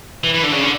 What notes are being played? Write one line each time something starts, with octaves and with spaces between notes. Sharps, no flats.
E3
E3
D3
C#3
D3